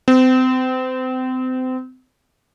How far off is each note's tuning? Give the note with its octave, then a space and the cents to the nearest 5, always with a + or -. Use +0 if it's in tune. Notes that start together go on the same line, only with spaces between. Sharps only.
C4 -30